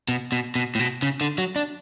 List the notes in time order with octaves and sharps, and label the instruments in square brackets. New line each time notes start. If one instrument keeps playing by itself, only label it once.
[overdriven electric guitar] B2
B2
B2
A2
B2
C#3
D3
F#3
D4